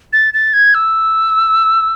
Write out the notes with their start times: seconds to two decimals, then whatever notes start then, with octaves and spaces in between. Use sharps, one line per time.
0.13 A6
0.34 A6
0.53 G#6
0.74 E6